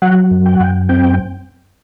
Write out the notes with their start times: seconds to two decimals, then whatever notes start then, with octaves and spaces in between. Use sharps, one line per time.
0.02 F#3 F#5
0.31 F#2
0.46 G5
0.54 F#5
0.60 F#2 G5
0.89 C4 G5